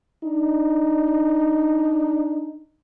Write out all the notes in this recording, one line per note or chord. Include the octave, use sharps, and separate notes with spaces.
D4 D#4